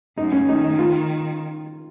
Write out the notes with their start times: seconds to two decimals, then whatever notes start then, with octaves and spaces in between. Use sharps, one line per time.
0.18 F#2 D#4
0.32 C#4
0.48 D#3 D#4
0.63 D#4
0.79 F4